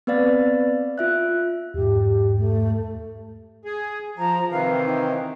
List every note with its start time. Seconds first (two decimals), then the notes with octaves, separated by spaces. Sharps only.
0.07 B3 C4 B4 D5 F5 A6
0.98 F4 E5 F#6
1.74 E2 G#2 G4
2.38 A3
3.65 G#4
4.17 F3 A#5
4.50 C3 D#3 E3 F5
4.85 D#4